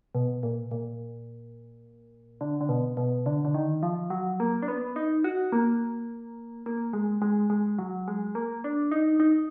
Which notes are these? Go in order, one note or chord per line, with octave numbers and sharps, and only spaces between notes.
B2
A#2
A#2
D3
D3
B2
B2
D3
D3
D#3
F3
F#3
A#3
D4
B3
D#4
F#4
A#3
A#3
G#3
G#3
G#3
F#3
G#3
A#3
D4
D#4
D#4